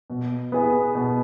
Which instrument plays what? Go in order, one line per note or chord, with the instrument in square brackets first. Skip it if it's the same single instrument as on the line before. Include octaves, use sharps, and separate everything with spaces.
[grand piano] B2
B3 E4 G#4
B2